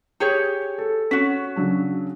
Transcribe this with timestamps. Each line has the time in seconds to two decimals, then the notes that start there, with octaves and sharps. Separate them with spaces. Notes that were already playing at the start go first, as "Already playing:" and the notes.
0.20 G4 G#4 C#5 C#7
0.78 A4
1.11 C#4 F#4 B6
1.56 C#3 F#3 D4